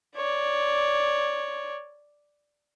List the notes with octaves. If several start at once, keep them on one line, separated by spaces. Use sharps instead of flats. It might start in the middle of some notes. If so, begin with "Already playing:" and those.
C#5 D5